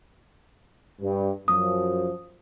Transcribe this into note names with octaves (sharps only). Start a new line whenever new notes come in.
G2
F#2 F3 D#6